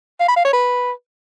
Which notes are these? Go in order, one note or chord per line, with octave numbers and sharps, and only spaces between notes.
F5
B5
F5
C#5
B4